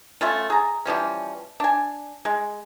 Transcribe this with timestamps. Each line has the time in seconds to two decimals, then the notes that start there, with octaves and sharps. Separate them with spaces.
0.21 A3 C#4 F4
0.50 G#4 A#5
0.85 E3 F3 G3 C#4
1.60 D4 G#5
2.25 G#3